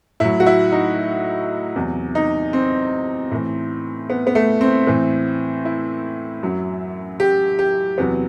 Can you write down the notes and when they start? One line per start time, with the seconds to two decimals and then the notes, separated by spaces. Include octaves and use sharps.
0.20 A2 F#3 E4
0.40 F#4
0.46 E4
0.72 D#4
1.76 E2 C3 F#3
2.15 D#4
2.53 C4
3.31 A2 E3
4.10 B3
4.27 B3
4.35 A3
4.61 C4
4.87 A2 E3
5.65 E4
6.43 F#2 F#3
7.20 G4
7.59 G4
7.98 E2 C3 F#3 B3